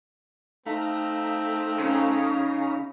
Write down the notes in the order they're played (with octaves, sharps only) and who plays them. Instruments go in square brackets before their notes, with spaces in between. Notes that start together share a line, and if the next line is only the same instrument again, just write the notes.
[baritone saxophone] A3 [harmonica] C4 [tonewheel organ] D#4 F5 A#5
[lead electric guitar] C#3